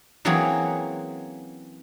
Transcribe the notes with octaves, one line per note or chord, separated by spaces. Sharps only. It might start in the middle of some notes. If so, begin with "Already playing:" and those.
E3 F#3 A#3 C4 C#4 G#4